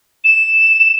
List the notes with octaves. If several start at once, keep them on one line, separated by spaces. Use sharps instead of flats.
E7